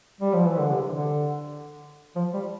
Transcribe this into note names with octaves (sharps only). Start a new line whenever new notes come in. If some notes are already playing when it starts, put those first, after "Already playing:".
G3
F3
E3
D3
C3
D3
F3
G3